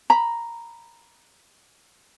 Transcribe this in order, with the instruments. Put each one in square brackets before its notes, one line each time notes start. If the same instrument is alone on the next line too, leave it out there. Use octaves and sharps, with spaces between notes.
[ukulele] A#5 B5